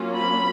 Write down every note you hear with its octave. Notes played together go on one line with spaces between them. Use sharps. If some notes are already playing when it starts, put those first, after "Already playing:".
Already playing: F#3 A#3 C#4 F4
B5